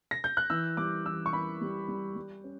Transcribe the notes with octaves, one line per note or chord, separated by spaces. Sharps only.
A#6
G6
F#6
E3 E6
G3 D6
E3 E6
C#6
E3 B5
G3
G3
G3
C#4